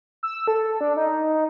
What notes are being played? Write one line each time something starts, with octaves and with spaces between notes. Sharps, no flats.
E6
A4
D4
D#4
D#4